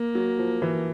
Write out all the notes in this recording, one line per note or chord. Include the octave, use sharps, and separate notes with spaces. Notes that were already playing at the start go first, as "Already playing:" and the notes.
Already playing: A#3
F#3
F3
E3